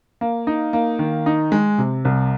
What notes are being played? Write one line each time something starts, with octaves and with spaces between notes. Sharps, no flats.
A#3
D#4
A#3
D#3
D#4
G#3
C3
C2